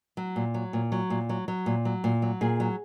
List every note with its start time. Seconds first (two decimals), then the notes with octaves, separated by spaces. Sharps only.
0.17 F#3
0.36 A#2
0.54 F#3
0.73 A#2
0.92 F#3
1.10 A#2
1.29 F#3
1.48 F#3
1.66 A#2
1.85 F#3
2.04 A#2
2.22 F#3
2.41 A#2 G#4
2.60 F#3